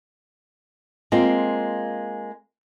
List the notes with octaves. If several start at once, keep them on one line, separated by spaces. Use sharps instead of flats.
G#3 A#3 C4 F4